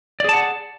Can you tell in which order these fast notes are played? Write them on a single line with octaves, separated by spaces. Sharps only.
D5 G#4 A5 F#5